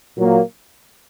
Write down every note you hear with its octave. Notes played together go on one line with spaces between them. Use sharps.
A#2 F#3 A#3